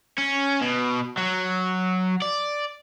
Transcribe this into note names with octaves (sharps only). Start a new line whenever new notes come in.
C#4
B2
F#3
D5